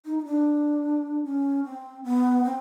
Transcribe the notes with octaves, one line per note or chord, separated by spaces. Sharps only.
D#4
D#4
D4
C#4
C4
B3
C4